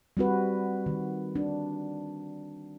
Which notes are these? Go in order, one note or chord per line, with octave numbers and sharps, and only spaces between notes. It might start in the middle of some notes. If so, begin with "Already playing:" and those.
G3 C4 F#4 B4
D#3
D4